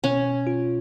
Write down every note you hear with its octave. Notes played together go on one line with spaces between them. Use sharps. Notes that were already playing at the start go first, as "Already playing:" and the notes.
B2 C#4
F4